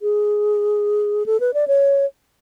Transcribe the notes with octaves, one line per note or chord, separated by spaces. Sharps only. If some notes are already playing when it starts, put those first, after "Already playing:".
G#4
A4
B4
D5
C#5